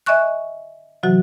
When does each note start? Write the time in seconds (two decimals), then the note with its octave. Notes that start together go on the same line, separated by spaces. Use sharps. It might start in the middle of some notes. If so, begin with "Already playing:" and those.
0.06 D#5 E5 G#5 C#6 F#6
1.03 C3 E3 F#3 F#4